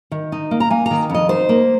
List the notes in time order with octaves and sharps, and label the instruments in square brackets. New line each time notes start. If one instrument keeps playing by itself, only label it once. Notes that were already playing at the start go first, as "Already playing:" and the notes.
[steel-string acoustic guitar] D#3
D#4
A#3
A#5
A#3 G#5
D#3 A#5
F2 D#5
D#4 C5
A#3